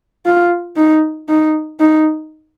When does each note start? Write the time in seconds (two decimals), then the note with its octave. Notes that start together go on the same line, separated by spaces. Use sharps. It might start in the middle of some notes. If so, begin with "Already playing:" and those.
0.26 F4
0.76 D#4
1.29 D#4
1.80 D#4